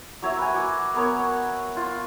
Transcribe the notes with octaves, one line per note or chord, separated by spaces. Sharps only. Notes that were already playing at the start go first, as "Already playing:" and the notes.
F#3 C#5 E5
B4 G#5
F#4 D6
B3 A#4 C#5
F4